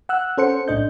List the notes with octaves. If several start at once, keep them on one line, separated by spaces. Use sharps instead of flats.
F#5 E6 F#6
C#4 A4 C5 F#5 C#7
B1 A2 D4 D#5 G6